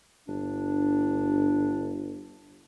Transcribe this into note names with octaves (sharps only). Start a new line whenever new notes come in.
G1 D4